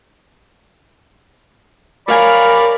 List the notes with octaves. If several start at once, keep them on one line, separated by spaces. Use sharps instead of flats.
A#4 C#5 D5 F5 G#5 B5